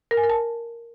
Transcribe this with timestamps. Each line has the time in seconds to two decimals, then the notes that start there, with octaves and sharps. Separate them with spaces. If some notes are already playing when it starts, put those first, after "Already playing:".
0.11 A#4
0.17 G#5
0.23 A#4
0.30 A5